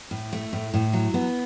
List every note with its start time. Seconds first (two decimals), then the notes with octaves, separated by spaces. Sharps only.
0.11 A2
0.33 A3
0.53 A2
0.74 A2
0.93 F#3
1.14 B3